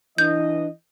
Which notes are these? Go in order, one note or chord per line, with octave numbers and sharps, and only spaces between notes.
E3 D4 D#5 G6